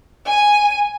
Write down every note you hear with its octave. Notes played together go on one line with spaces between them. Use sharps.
G#5 D#7